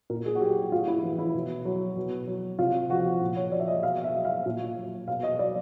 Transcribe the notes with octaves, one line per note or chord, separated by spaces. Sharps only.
A#2 A#4
G#4
F#4
F#3 G4
F#4
A2 F4
E4
E3
E4
B2
F#3
B2
F#3
C3 F4
F3 F#4
A#2
C#5
F3 D5
E5
D#5
B2 F5
E5
F#3
F5
A#2
F#3
B2 F5
D#5
F#3 D5